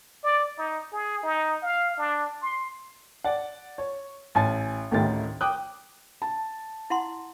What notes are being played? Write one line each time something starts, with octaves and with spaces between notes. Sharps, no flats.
D5
D#4
G#4
D#4
F5
D4
C6
D5 F#5
C#5
A1 G#5 A6
A1 D2 A2 D#3 G4 A6
G5 D6 D#6 F#6
A5
E4 F#5 C6